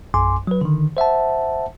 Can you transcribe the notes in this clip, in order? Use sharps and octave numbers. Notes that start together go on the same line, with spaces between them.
A#1 F#2 G#5 C6 D6
F#3 B4
D3 D#3
C5 E5 F#5 A5